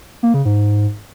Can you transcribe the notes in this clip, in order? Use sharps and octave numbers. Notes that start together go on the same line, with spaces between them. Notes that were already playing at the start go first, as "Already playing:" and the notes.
A#3
C#3
G#2